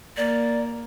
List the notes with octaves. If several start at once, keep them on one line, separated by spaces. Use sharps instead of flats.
A#3 D5